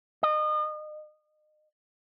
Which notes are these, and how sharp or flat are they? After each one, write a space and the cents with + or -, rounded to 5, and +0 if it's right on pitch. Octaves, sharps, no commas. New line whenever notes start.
D#5 -35